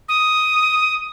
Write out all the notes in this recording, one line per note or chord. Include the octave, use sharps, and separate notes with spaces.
D#6